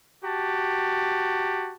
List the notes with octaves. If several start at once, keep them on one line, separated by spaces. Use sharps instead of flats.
F#4 G4 A5